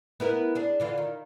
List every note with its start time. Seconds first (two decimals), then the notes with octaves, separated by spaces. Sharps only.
0.20 B3 E4 A#4
0.55 D4 G#4
0.80 D3 E3 F4
0.98 D#3